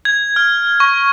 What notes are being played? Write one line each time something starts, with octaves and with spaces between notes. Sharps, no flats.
G#6
F6
C#6